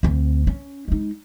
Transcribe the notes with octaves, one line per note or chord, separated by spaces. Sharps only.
D2 C4
C#4
G#3 D#4